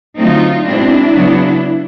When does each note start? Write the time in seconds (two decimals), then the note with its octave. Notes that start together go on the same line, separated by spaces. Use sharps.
0.17 D3 F#3 A3 C4 D#4 F4
0.65 B2 G#3 C4 D4 E4
1.14 C#3 F#3 B3